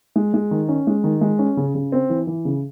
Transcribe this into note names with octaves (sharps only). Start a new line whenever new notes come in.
G#3
G#3
D#3
C#4
G#3
D#3
G#3
C#4
C#3
C#3
C4
E3
E3
C#3